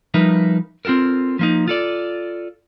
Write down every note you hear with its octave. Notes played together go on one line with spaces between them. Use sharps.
F3 G3 D#4 A#4 B4 E5
C4 F4 F#4 A4 A#4
F3 A#3 D#4
F4 A4 D5